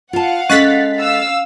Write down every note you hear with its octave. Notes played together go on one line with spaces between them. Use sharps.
F4 F5 F#5 A5
G#3 C#4 A4 F#6 A6 B6
F5 E6